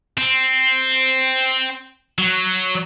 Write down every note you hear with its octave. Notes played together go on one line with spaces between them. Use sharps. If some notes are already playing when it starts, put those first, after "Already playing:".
C4
F#3